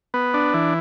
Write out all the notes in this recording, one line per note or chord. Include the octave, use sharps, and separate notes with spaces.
B3
D4
E3